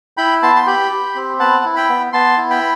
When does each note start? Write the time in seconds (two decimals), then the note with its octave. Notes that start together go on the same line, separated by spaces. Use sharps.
0.17 E4 G5 B5
0.42 B3 A5 C6
0.55 C6
0.66 G4 G5 B5
0.91 G4
1.15 C4
1.39 B3 F#5 A5
1.65 E4
1.76 G5 B5
1.89 B3
2.13 B3 A5 C6
2.37 E4
2.50 G5 B5